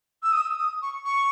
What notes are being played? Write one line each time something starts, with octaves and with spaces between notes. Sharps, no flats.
E6
D#6
E6
D#6
C#6
C#6